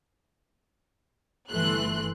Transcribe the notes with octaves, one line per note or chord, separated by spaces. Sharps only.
G1 E3 A3 C6 F#6